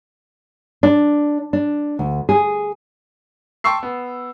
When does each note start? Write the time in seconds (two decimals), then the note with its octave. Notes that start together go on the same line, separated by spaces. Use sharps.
0.83 D4
1.53 D4
1.99 D2
2.29 G#4
3.64 G5 A5 C6 C#6 E6 C7
3.83 B3